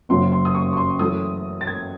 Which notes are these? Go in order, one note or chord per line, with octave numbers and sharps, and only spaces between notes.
F#1 F#2 C#3 F#3 C6
C6
D#6
C#6
C#6
C6
F#2 E3 A3 D#6
A6
G#6